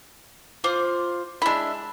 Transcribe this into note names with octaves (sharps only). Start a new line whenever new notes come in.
F4 C5 D6
G#3 D4 E4 B5